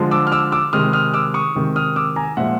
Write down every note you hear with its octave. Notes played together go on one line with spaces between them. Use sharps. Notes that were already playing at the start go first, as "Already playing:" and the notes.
Already playing: D3 F3 G#3
D6 E6
F6
D6 E6
D6 E6
C3 D#3 G#3 D#6 F6
D#6 F6
D6 E6
C#6 D#6
C3 D#3 G#3
D#6 F6
D6 E6
G#5 A#5
A#2 F3 G#3 E5 F#5